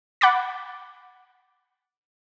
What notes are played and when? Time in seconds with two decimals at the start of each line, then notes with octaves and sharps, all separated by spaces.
0.21 F#5 B5 D6 A6